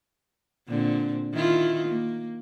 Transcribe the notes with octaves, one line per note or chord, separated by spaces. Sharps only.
A#2 D3 C4
D#3 E4 F4
A#3